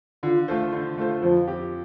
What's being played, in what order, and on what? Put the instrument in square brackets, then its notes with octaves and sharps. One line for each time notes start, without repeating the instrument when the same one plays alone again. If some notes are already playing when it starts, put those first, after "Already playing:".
[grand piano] D3 [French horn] F4
[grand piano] A3 F4 A4 C5
D3
A3 F4 A4 C5
[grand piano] F2 [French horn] F3
[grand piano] F3 C4 G4